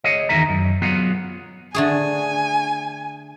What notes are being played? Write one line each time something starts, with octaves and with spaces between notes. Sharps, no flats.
G#4 C#5 D#5
E2 D#3 D#4 G#4 E5 A#5
F#2
F#3 B3 F4 G#4 F#5
D3 A3 G#4 G#5